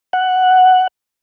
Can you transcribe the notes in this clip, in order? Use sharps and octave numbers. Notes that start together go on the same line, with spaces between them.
F#5